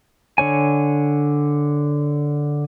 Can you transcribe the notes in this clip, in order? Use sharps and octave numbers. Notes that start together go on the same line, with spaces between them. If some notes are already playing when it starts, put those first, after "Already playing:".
D3 C#5 G#5